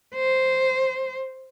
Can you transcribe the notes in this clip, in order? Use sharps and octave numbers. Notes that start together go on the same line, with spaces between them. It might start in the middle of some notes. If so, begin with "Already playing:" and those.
C5